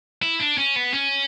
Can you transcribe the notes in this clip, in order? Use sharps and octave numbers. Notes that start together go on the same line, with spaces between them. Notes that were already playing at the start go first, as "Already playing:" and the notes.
E4
D4
C#4
B3
C#4